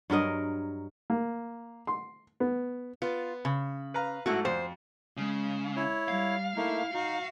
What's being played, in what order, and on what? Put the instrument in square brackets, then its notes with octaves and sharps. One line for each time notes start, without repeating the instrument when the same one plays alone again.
[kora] G2 F#3 A#4 D#5
[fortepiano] A#3
C6
B3
[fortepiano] B3 [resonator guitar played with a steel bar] F4
[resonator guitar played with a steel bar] C#3 [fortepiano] B5
[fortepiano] B4 F5 A#5
[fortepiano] G#2 F#3 A3 [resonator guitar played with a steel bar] E4 F#4
[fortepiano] F2 [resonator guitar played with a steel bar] C5
[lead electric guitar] C#3 [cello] G#3
[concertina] E4 C#5
[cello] G3 [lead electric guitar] F5
[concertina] A3 A#3 D#4 [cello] E4
[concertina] D#4 [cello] F#4